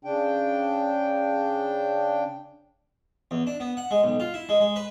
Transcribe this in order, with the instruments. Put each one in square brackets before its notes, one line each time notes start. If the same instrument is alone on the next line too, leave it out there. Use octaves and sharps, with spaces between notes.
[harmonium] C#3 D4 G5
[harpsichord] E2
D4
B3
F#5
G#3
B1
F4
E4
G#3
G#3
B4